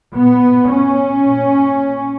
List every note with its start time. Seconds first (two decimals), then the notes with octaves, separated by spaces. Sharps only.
0.15 A#2 B3
0.72 C#4
1.27 A#2